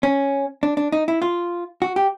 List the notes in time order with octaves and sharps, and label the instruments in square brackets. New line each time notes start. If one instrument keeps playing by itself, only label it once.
[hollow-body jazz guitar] C#4
D4
D4
D#4
E4
F4
F#4
G4